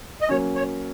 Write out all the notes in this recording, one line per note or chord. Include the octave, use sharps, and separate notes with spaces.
D#5
F#3 A#3 C#4 C#5
C#5